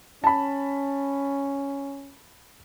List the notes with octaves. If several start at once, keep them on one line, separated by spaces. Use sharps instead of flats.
C#4 A5 B5